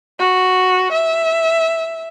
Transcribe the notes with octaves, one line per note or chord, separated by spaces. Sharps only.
F#4
E5